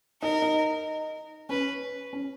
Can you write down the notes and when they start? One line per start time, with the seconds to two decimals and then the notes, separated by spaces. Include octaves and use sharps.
0.22 D#4 A#4
0.42 D#4
1.49 C#4 B4
2.13 C#4